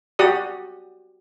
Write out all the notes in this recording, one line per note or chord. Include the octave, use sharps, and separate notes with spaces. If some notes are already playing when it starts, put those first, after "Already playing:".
F#4 G4 D5 D#6